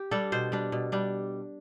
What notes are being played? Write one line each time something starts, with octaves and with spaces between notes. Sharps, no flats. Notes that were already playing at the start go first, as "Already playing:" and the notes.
Already playing: G4
G3 D4 A4
B2 C5
G3 D4
B2
G3 D4